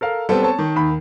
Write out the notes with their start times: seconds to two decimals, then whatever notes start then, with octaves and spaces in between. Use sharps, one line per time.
0.01 A4 A#4 F5
0.29 G3 B3 C4 A4
0.42 C#5 A5
0.59 D#3
0.76 D#2 B5